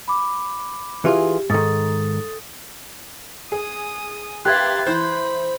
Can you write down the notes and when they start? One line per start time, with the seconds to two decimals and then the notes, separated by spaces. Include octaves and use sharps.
0.08 B5 D6
1.05 E3 F4 G4 G#4
1.50 G#2 D#3 A4 D#6 A6
3.52 G#4 D#6
4.45 A#3 G4 B4 E5 C6 F#6 G#6 A6
4.87 E3 C5 B5 G6